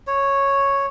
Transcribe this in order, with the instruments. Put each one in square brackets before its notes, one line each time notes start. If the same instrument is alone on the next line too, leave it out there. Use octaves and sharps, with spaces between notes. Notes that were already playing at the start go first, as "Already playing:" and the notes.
[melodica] C#5